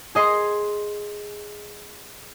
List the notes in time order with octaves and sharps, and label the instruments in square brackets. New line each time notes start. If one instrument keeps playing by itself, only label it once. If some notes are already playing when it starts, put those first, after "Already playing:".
[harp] G#4 D#5 C6 D#6